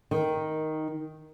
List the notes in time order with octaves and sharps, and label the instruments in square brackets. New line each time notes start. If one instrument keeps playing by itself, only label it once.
[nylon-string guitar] D#3